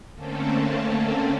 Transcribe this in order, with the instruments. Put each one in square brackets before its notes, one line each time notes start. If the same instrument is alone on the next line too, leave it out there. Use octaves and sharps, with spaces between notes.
[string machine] D3 A3 A#3 C4 C#4 A4